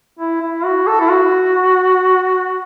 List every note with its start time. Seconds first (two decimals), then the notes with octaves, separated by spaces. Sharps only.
0.19 E4
0.41 E4
0.65 F#4
0.87 A4
1.01 E4
1.10 F#4